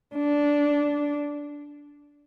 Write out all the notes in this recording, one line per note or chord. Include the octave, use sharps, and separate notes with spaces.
D4